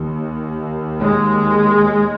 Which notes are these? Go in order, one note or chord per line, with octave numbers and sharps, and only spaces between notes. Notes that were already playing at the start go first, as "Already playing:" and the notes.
Already playing: D#2
G#3